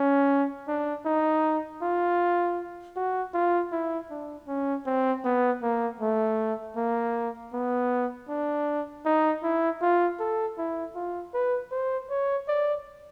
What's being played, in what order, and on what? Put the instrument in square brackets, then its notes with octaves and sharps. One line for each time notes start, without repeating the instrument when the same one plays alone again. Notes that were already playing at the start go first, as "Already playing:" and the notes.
Already playing: [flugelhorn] C#4
D4
D#4
F4
F#4
F4
E4
D4
C#4
C4
B3
A#3
A3
A#3
B3
D4
D#4
E4
F4
A4
E4
F4
B4
C5
C#5
D5